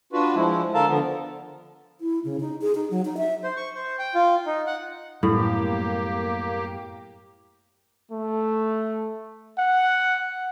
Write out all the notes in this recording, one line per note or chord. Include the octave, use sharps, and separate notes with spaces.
D4 F4 F#4 B4
F3 G#3 E4
D3 A4 A#4 F5 A5
D3 F3 B3
E4
C#3
D#4
G#4
D#4
F#3
D#4
E5
C5
C#6
C5
G5
F4
D#4
F#5
F#2 A2 G3 A#3 B3 G4
A3
F#5